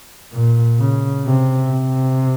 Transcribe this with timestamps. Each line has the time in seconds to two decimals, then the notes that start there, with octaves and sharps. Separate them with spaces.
0.33 A#2
0.79 C#3
1.25 C3
1.72 C3